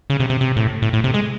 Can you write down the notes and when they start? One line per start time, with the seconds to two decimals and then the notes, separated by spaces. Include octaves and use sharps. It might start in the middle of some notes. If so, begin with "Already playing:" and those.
0.10 C#3
0.20 C3
0.30 C3
0.41 C3
0.56 A2
0.82 A2
0.93 A2
1.04 C3
1.14 G#3